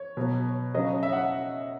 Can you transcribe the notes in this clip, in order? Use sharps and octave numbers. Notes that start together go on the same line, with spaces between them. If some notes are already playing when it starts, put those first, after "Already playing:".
Already playing: C#5
B2 F#3
C#3 F#3 D#5
E5
F#5